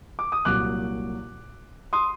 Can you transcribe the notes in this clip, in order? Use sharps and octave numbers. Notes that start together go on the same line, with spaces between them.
D6
D#6
C2 A#2 F#3 D6 F#6
C6 D#6